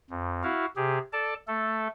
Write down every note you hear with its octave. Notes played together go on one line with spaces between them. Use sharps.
F2
E4 F#4 F5
C3 G4 G#4
A4 D5 A5
A3 A4